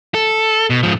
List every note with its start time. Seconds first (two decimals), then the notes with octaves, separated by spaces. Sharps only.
0.14 A4
0.70 B2
0.83 G#2 F3